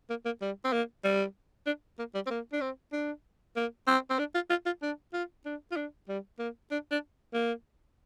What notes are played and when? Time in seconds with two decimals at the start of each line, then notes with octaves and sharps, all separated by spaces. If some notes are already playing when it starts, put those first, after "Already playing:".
0.10 A#3
0.25 A#3
0.41 G3
0.65 C4
0.72 A#3
1.04 G3
1.66 D4
1.99 A#3
2.14 G3
2.26 C4
2.30 A#3
2.53 D4
2.61 C4
2.92 D4
3.56 A#3
3.87 C4
4.10 C4
4.19 D4
4.34 F4
4.50 F4
4.66 F4
4.82 D4
5.13 F4
5.45 D4
5.71 F4
5.76 D4
6.08 G3
6.39 A#3
6.71 D4
6.91 D4
7.33 A#3